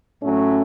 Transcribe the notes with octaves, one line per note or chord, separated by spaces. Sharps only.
A2 F#3 A3 C#4